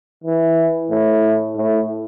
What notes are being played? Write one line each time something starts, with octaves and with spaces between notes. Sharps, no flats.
E3
A2
A2